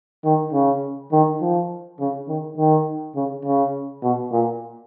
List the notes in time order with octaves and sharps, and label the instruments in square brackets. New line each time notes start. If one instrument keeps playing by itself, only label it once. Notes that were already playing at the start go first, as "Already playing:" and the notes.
[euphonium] D#3
C#3
D#3
F3
C#3
D#3
D#3
C#3
C#3
B2
A#2